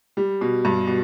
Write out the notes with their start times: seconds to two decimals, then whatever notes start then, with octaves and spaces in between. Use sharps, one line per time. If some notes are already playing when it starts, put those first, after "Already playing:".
0.17 G3
0.41 B2
0.65 G2
0.88 B2